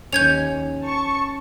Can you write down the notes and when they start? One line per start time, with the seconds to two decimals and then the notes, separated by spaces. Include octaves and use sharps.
0.13 D#2 C#4 G6 G#6 F7
0.83 A5 C#6